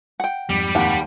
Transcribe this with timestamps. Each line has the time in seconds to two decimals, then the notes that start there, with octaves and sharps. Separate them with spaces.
0.20 F#5 G5
0.49 F2 G#2 G3
0.75 D#2 F#5